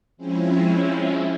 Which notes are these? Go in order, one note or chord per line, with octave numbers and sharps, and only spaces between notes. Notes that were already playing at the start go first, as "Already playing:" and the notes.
F3 G#3 C4 C#4 E4